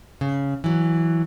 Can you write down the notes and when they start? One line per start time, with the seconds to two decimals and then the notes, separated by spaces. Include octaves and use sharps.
0.21 C#3
0.64 E3 F#3